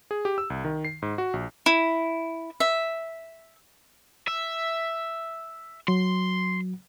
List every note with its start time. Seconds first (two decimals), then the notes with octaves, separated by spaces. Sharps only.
0.11 G#4
0.25 G4
0.38 E6
0.50 C2
0.65 D#3
0.85 C7
1.02 G#2
1.18 F#4
1.33 A#1
1.66 E4
2.60 E5
4.28 E5
5.88 F#3 C6